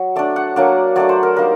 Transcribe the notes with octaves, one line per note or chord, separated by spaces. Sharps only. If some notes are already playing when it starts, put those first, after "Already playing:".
Already playing: F#3
A3 D4 D5
F#5
F#3 A#3 D4 D5
F#3 A3 D4 D5
C5
A#4
G3 A#3 D#4 A#4